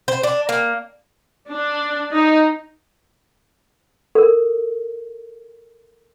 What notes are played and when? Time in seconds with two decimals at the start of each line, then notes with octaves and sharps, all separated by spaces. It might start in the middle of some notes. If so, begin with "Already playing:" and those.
0.08 C5
0.23 D4
0.49 A#3
1.49 D4
2.12 D#4
4.15 A4 A#4